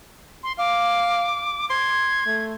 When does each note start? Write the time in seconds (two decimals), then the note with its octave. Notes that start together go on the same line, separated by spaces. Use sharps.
0.43 C6
0.59 F5 D6
1.70 C6 G#6
2.26 A3